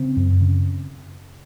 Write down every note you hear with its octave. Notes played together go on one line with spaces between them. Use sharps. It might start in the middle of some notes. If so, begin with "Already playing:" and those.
Already playing: C#3 C4
F#2
C#3